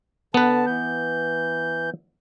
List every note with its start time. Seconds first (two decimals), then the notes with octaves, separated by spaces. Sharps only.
0.34 D3 B3 B4 A5
0.66 E3 G6